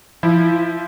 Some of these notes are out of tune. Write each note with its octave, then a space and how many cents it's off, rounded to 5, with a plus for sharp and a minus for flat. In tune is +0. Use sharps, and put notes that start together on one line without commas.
F3 -35 E4 -5